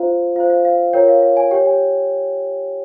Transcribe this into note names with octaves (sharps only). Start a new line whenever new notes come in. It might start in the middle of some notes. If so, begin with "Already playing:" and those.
Already playing: F4 C5 F5
F4 C5 F5
F5
F5
F4 A#4 C#5 G5
F5
F5
G#5
G4 C#5 G5
G#5